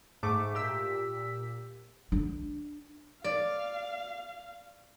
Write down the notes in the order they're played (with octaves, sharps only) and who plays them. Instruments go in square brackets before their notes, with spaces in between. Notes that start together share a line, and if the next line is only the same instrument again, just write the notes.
[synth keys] G#2 A3 D6
A#2 G4 E6 B6
[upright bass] D4
[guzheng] D5 [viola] F5